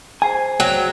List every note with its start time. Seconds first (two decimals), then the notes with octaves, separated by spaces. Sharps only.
0.22 G#4 C5 G#5
0.60 F#3 G5